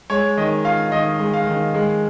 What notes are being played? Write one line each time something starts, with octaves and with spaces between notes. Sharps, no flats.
G#3 C#5
D#3 D#5
F4 F5
D#3 D#5
G#3
F5
D#3
G#3